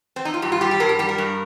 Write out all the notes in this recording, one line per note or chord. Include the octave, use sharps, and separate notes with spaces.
C4
D#4
F4
G2 G4
F4
G3 G4
G4
G2 A#4
G4
G3 G4
A#4
G2